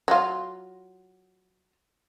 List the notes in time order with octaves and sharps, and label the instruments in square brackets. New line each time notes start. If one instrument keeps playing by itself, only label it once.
[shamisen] F#3 F4